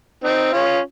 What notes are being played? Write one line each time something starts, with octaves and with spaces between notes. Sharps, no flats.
C4 D#4
C#4 F4